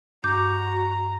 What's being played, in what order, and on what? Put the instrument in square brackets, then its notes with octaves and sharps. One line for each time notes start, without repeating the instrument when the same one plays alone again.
[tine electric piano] G2 [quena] F#4 [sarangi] A#5 [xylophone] D6 G6